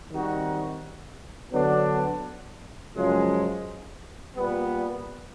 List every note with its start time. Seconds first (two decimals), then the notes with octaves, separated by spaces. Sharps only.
0.12 D#3 G3 C4 D#4 F#4
1.53 D3 F#3 B3 D4
2.95 F#2 C#3 F3 G#3
4.37 A#2 G3 B3